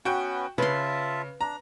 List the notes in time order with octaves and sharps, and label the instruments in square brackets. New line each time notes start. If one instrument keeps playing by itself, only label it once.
[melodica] B3 C#4 B4 [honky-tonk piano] F#4 G5
[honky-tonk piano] C#3 [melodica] F4 E5 A5 [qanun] B4 C6
[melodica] D4 [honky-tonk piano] A#5